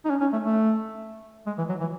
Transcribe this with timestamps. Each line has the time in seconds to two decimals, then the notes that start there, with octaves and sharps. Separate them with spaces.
0.05 D#4
0.10 C#4
0.21 C#4
0.33 A3
0.44 A3
1.47 G#3
1.58 E3
1.69 F#3
1.80 E3